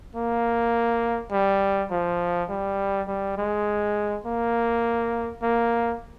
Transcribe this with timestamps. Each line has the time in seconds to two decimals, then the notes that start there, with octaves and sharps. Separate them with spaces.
0.16 A#3
1.32 G3
1.91 F3
2.49 G3
3.08 G3
3.38 G#3
4.25 A#3
5.42 A#3